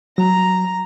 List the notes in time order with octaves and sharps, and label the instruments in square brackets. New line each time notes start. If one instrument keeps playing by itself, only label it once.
[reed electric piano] F#3 [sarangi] A#5